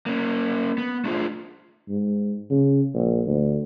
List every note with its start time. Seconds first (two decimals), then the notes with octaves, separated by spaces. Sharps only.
0.06 A#3 C#4
0.78 B3
1.05 A3 D4 F4 G#4 C5
1.89 G#2
2.50 C#3
2.94 A#1
3.26 D2